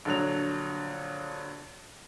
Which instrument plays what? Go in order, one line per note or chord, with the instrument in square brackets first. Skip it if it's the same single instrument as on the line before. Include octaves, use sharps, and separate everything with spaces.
[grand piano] A#1 D3 F#3 F7